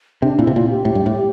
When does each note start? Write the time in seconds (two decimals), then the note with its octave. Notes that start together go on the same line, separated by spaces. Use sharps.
0.22 C3 D4
0.38 A#2 E4
0.47 C3
0.54 A#2 F4
0.70 G4
0.85 A2
0.95 G2
1.06 A2